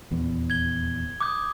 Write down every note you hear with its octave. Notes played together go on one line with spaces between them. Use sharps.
D#1 E2
G#6 G7
D6 D#6 G6